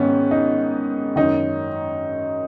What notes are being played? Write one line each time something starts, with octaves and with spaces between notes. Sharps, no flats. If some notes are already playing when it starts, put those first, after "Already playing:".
Already playing: G#2 D#3 B3 C#4
D#4
F#2 D#3 D#4